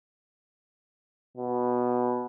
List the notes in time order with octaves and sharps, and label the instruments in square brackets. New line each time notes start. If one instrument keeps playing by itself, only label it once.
[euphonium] B2